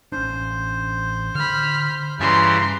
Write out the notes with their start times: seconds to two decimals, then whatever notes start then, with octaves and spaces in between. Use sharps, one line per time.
0.12 A1 C#4 D4 C5
1.35 D3 B5 F6
2.20 G2 C#3 E3 G3 A#5 C6